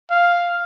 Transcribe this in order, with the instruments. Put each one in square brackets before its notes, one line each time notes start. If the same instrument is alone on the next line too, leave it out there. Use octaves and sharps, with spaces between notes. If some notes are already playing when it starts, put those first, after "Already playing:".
[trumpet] F5